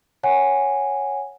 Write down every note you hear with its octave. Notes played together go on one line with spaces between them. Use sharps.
C#5 F#5 G#5